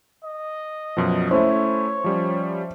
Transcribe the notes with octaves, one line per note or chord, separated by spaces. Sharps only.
D#5
F#2 B2 F3
A3 C#4 E4 C5 C#5 E5
F3 G3 C#4